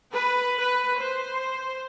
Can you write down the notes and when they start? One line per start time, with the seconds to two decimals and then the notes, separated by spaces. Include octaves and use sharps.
0.12 B4
0.59 B4
0.98 C5